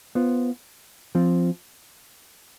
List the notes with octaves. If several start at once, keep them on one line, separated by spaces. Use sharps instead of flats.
B3 F4 C5
F3 C4 F4